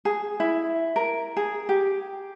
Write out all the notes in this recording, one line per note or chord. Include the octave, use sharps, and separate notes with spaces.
G#4
E4
A#4
G#4
G4